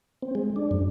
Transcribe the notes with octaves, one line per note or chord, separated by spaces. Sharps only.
C4
G#3
D4
F#2